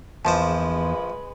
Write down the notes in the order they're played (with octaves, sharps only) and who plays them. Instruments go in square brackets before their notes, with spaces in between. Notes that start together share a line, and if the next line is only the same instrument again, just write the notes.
[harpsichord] A#1 F3 C5 [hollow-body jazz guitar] E2 A5 [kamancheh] G#3 B4